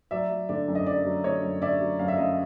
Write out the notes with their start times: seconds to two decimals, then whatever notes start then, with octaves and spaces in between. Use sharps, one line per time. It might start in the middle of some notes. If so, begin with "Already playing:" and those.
0.11 F#3 D5 E5
0.30 F#3
0.49 D3 D5
0.68 F#2
0.75 D#5
0.87 F#2 D5
1.05 F#3
1.24 D3 C#5 D#5
1.43 F#2
1.62 D3 D5 E5
1.81 F#3
1.99 F#2 F5
2.08 E5
2.17 F#2 D#5 F5